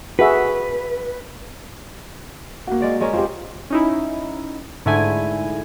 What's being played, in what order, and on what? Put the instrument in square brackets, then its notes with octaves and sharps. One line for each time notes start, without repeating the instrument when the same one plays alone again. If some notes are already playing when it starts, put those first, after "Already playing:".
[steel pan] F#4 G#4 E5 [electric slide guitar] B4
[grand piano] A#3 F#4
[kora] G#3 D5 F5
G#3 C#4 A#4
[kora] C4 [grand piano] F4 G4
[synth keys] C#4 D#4 E4
G#2 D3 A3 E4 G#5